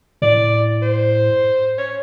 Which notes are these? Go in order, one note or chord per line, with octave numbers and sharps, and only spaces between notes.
A2 D5
C5
C#5